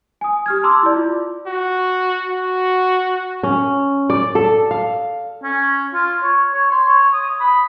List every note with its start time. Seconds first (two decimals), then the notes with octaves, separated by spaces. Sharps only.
0.21 G#5 D#6
0.46 G4 F6 G#6
0.63 A5 A#5 C6 D6 E6
0.83 E4 D5
0.96 F4
1.47 F#4
2.29 F#4
3.43 C#4
4.10 D5
4.35 A4
4.71 F5
5.43 C#4
5.94 F4
6.23 C#5
6.54 C#5
6.71 C6
6.89 C#5
7.13 D#6
7.40 B5